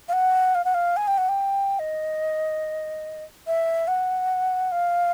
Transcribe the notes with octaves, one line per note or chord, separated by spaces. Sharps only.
F5
F#5
F5
F#5
F5
G#5
G5
F#5
G5
D#5
E5
F#5
F5